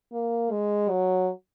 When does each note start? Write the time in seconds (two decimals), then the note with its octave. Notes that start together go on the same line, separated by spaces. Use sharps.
0.13 A#3
0.51 G#3
0.90 F#3